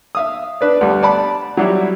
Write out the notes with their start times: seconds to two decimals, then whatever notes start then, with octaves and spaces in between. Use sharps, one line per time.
0.15 E5 F5 D#6
0.61 D4 B4 D5
0.81 D2 G3
1.03 D5 A5 B5
1.57 F#3 G3 E4